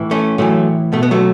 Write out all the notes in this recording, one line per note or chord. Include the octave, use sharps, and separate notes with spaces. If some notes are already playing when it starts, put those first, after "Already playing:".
Already playing: A2 E3
A3 C#4
A2 E3 F#3 A3
B2 A3
B3
F#3 A3